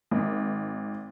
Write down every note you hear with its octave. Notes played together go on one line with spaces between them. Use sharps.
G#1